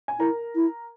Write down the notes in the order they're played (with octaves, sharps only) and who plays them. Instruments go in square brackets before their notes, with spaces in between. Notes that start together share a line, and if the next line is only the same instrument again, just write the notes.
[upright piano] G#5
[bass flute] E4 [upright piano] A#4 A#5
[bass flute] E4